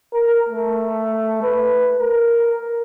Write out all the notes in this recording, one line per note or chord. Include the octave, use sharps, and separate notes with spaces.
A#4
A3
B4
A#4